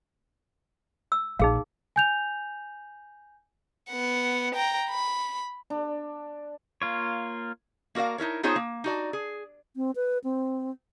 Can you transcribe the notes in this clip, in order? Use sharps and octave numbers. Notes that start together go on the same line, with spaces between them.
E6
A#1 D#4 G#4 F5
G#5 G6 F7
B3 F#5
G5 A#5
B5
D4
A#3 F4 C#5
A#3 F#4 A#4 D5 F5
D#4 E4 A#4 C#5
B3 D#4 F4 G#4 C5 C#5
A#3
D#4 F#4 D5
G#4
C4
B4
C4